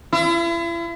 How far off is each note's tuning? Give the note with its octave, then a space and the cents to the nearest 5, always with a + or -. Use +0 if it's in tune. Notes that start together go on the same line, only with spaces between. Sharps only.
E4 +40